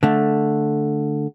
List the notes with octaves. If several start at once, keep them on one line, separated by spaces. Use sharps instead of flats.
D3 A3